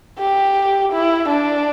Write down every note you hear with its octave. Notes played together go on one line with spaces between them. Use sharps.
G4
E4
D4